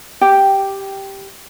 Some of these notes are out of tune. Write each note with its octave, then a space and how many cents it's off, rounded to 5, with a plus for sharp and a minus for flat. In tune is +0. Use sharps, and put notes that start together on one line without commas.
G4 +0 G5 -5